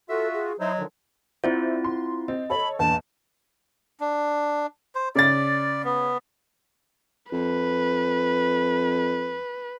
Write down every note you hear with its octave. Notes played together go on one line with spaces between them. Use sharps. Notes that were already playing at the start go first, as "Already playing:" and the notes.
F4 F#4 A4 E5
G#4
F#3 D#4 E4 C5 D#5
D3 D#3 F3
C4 E4 F4 C5 D5 E5
C6
C4 D#5
A4 C#5 B5
E2 G2 A#2 A5
D4
C5
C#3 D5 A6
B3
F2 B4